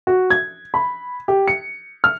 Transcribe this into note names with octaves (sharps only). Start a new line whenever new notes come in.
F#4
G#6
B5
G4
C#7
F6